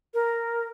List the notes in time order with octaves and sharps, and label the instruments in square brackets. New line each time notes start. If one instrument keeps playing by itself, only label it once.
[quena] A#4